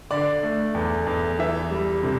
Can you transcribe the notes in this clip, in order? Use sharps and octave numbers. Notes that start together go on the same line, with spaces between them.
D3 D5
A3
E2
E2
E3 E5
G3
C3